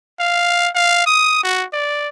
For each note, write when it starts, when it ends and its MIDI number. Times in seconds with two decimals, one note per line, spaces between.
0.20 0.69 77
0.75 1.06 77
1.06 1.40 87
1.43 1.65 66
1.73 2.08 74